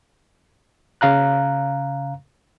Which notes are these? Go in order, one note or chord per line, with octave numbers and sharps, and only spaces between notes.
C#3 F5 A#5 F#6